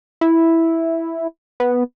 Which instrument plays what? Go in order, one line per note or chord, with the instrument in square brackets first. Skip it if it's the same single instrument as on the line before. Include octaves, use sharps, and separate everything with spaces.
[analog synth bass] E4
B3